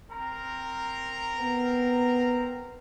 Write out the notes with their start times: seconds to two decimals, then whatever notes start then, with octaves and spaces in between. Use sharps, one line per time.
0.10 C4 A#4 A#5
1.37 B3